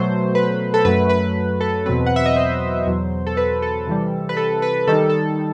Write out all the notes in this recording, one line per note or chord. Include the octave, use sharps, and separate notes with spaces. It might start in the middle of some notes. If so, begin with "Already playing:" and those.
Already playing: B2 F#3 A3 C5
B4
A4
F#2 F#3 A3 B4
B4
A4
E2 B2 F#3 C4 B4
F#5
E5
D#5
C5
E2 B2 F#3
A4
B4
A4
C3 E3 G3
B4
A4
B4
D#3 G3 D#4 A4
A4